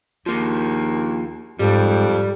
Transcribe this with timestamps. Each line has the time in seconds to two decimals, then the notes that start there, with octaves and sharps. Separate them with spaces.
0.26 D#2 F3 A#3
1.59 F2 G#2 G3